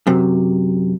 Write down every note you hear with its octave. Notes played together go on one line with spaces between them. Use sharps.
F#2 C3